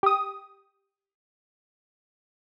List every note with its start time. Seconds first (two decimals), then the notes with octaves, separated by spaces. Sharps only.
0.03 G4 D#6